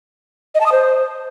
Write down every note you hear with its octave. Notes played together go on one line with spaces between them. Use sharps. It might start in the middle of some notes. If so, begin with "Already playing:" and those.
D#5
A5
D#6
C5